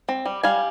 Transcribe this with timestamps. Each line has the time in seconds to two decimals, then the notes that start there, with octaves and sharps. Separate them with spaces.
0.09 C4
0.26 G3
0.43 G3 F5 G#5